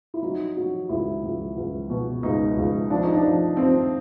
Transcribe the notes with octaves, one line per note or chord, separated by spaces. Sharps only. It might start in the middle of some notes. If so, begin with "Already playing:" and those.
E4
F#3 D#4
F#3
C#2 E4
C#2
C#2
B2
C#2 D#4
C#2
F3 D4
D#4
D4
F3
F3 C4